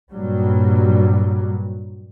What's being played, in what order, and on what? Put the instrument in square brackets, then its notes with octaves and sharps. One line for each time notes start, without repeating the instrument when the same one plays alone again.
[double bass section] G2 A#2 F#3 G3